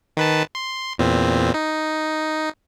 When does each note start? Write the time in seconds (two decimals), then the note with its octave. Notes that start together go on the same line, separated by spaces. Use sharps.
0.17 D#3 B4 A5
0.55 C6
0.98 E2 A#2 C4
1.54 D#4